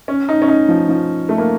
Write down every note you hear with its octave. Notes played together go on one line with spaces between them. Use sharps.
C#4
D#4
C#4
D#4
F3
F3
A3
A#3